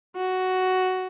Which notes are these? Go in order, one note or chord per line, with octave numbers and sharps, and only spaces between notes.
F#4